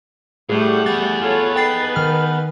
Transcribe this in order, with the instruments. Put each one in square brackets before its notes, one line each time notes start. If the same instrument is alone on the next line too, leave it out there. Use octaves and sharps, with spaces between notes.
[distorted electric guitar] A2 [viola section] G3 A3 F#5 [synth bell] G#4
[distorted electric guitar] B3 G#4 [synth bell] A6
[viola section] F4 A4 C#5
[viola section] D#4 B4 [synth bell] G5 A6 C7
[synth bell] D#3 F6